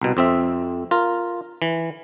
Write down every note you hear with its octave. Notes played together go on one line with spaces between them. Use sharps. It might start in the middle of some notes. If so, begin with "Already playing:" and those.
C2 B2
F2 C4 E5
F4 A#4
E3